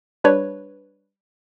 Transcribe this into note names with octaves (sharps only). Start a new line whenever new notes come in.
G3 D4 B4 C#5